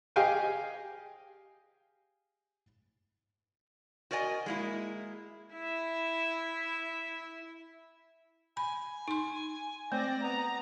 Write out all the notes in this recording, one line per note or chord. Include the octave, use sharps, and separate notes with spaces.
G4 G#4 D#5 F5 G5 G#5
F#4 A#4 D5 D#5 G#5
G#3 A#3 E4
E4 E5
G#5 B5
D#4 C6
A3 C4 D5 A#6
B3 A#5